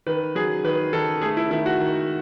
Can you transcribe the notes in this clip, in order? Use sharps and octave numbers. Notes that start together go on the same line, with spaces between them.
D#3 B4
F#3 G#4
D#3 B4
D#3 A4
A3 G#4
E4
D#3 E4
F#4
D#3